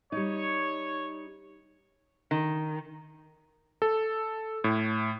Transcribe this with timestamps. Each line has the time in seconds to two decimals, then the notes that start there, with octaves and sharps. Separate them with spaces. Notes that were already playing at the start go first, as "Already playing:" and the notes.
0.12 G3 D#4 C#5
2.31 D#3
3.82 A4
4.64 A2